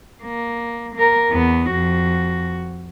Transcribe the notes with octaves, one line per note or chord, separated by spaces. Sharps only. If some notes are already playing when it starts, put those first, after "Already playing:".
A#3
A#3 A#4
E2 B3
F2 F#4